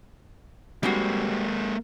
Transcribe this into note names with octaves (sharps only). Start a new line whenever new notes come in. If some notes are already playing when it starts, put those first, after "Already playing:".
G3 G#3 A#3 C4 F#4